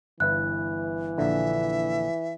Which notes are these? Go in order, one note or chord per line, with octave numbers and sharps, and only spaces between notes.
G1 E3 E4 B4 F#6
A#1 D3 E5